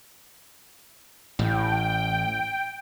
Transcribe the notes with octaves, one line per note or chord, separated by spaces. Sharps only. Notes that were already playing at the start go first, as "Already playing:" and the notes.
A1 A2 G5